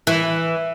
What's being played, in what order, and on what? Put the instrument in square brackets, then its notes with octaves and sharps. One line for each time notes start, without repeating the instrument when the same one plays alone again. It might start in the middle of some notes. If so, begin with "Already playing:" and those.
[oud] E3